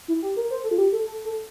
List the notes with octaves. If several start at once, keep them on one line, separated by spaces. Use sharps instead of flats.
E4
G4
A#4
C5
A4
F4
G4
A4
A4
A4